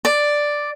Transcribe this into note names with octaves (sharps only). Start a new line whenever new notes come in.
D5